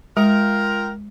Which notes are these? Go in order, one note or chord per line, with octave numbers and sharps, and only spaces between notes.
G#3 F4 A#4 G5